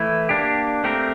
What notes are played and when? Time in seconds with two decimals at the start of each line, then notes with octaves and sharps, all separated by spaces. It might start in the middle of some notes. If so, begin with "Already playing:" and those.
Already playing: E3 A3 E4
0.29 A#3 D4 G4
0.84 A3 C4 G4 A#4